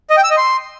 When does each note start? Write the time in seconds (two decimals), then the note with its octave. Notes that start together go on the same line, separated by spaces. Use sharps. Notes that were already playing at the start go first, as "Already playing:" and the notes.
0.10 D#5
0.17 G5
0.24 E6
0.31 D#5
0.37 C6